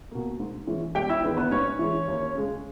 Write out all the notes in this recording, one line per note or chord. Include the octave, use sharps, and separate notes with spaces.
B2 A#3
G#2
E3 G#3 C#4
E1 G4 G5
E4 E5
E2 D#3 G#3 B3
B3 B4
G#2 C#4 C#5
E3 G#3
D#2
C#3 G#3